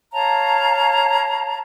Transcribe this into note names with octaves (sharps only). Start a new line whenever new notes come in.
C#5 F5 A5 A#5